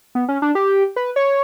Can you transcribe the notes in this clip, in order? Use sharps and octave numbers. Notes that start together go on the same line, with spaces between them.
B3
C#4
D4
G4
B4
C#5